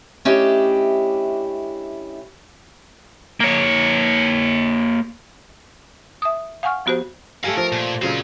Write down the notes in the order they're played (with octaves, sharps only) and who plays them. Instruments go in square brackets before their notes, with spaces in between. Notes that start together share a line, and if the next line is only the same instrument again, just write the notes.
[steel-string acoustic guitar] A3 C#4 D4 E4 G4 D#5
[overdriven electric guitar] A#3 C#5
[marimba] E5 D#6
F5 F#5 G#5 C#6 F6
F3 B3 F#4 G4 C5
[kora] A3 G4 A#4 [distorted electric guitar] F5 G#5
[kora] F3 [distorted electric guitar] A#4
[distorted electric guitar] A#2
[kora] A#2 C#3 F#3 [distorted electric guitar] C4 F5